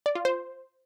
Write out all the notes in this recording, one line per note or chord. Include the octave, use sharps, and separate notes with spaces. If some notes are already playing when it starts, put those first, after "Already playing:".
D5
F4
C5